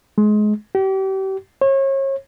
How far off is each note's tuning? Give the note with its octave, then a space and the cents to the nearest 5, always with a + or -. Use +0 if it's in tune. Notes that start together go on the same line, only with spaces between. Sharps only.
G#3 +25
G4 -35
C#5 -35